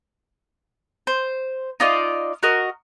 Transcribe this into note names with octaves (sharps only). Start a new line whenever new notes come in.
C5
D#4 F4 D5 D#5
F#4 A#4 D#5